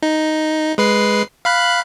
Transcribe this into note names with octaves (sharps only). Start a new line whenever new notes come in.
D#4
G#3 B4 C7
F5 B5 F#6